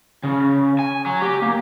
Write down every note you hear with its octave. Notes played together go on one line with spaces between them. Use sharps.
C#3
G#5
F#3
G4
A#3